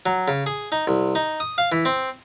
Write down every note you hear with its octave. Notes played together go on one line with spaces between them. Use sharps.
F#3
C#3
G#4
D#4
C2
D#4
D#6
F5
E3
C4